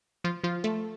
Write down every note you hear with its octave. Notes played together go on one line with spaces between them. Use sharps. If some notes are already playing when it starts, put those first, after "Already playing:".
F3 F4
F3 F4
A3 A4